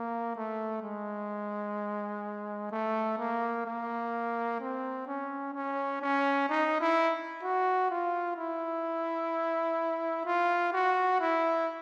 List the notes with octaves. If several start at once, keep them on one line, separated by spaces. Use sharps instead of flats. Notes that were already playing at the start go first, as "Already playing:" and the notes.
Already playing: A#3
A3
G#3
A3
A#3
A#3
C4
C#4
C#4
C#4
D#4
E4
F#4
F4
E4
F4
F#4
E4